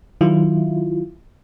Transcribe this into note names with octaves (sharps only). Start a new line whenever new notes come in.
D#3 F#3 E4 F4